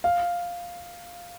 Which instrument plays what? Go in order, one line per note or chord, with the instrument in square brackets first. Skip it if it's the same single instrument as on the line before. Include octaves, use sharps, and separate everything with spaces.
[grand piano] F5